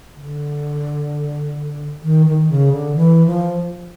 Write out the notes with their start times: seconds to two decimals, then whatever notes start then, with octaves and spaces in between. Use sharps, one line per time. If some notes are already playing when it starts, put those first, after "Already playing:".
0.16 D3
2.03 D#3
2.26 D#3
2.49 C#3
2.72 D3
2.96 E3
3.26 F3